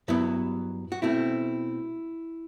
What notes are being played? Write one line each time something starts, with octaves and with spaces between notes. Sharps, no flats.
G2 F#3 B3 E4
F#4
B2 A3 C4 E4